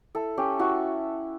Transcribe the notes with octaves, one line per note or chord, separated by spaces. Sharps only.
E4 A4
C#4 G4
E4 F#4